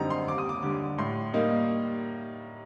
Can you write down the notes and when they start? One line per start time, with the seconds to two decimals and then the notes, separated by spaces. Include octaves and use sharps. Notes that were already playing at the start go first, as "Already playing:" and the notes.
Already playing: F#2 D3 G3 C4 D#4 A#5
0.10 C6
0.27 D#2 D6
0.38 D#6
0.49 D6
0.63 D3 G3 D6
0.98 A2 C6
1.33 G3 A#3 D#4